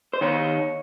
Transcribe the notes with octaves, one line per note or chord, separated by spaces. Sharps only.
C5
D#3 C#5